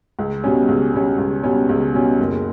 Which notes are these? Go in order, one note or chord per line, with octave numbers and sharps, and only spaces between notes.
C#2
B2 G3 C#4
C#2
B2 G3 C#4
C#2
B2 G3 C#4
C#2
B2 G3 C#4
F#1